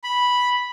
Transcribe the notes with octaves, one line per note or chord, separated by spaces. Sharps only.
B5